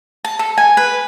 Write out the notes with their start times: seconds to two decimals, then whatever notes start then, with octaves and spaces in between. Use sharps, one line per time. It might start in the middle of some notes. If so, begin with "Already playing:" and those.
0.24 A5
0.39 A4
0.58 G#5
0.77 B4